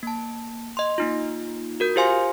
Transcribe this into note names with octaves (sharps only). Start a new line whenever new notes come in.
A#3 A5
D#5 C6
A#3 D#4 F4
F#4 A#4 G6
F4 G4 C5 F5 G#5 C6